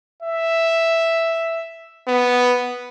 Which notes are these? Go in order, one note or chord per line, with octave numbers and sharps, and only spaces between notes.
E5
B3